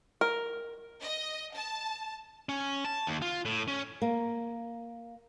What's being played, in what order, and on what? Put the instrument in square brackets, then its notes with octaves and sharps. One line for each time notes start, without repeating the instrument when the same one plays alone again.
[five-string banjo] A#4
[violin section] D#5
A5
[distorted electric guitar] C#4
A5
D#2
F4
A2
C#4
[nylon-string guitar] A#3